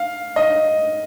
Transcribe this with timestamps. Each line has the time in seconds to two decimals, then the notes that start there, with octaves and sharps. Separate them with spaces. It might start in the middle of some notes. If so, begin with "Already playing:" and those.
Already playing: F5
0.36 D#5